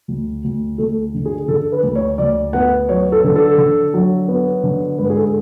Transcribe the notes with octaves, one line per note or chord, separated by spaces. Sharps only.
D2
D2
D2 A4
D3
G#4
D3 A4
B4
D2
C#5
D2 D5
B3 F#5
F#3 C#5
A4
D3
A4
D3
F#3
B3
D3
G#2 B4
G#4
A4